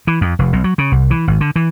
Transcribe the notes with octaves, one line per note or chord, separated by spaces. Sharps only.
E3
F2
F1
B1
F#3
C#3
C2
E3
G#1
D3
E3